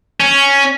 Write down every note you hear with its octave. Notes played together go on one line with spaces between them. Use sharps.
C#4